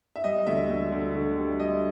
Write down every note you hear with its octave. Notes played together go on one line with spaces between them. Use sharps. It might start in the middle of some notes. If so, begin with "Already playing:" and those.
E5
G3 D#5
D2 E5
D2
D2
D3
G3
G3 D#5